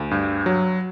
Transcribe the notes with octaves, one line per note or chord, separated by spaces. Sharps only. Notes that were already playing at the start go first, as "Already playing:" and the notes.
Already playing: D2
G2
F#3